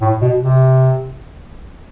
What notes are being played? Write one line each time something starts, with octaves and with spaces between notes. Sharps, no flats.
A2
B2
C3